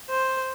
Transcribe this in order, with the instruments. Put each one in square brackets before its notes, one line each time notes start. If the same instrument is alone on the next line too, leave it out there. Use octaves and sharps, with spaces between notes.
[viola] C5